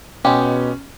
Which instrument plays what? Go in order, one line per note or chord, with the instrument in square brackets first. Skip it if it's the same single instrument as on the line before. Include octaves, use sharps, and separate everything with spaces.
[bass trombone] B2 [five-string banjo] G#3 B3 G4 [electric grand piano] C#4